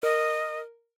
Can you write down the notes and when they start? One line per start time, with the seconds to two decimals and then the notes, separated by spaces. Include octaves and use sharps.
0.03 A#4 D#5